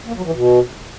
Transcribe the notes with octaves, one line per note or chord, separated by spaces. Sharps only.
A#3
F#3
E3
B2